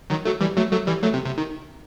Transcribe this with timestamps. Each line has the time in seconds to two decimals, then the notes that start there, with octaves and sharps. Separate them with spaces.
0.10 D#3 F#3
0.25 F#3 A3
0.41 E3 G3
0.57 F#3 A3
0.71 F#3 A3
0.87 E3 G3
1.03 F#3 A3
1.14 C3
1.26 C3
1.38 D#3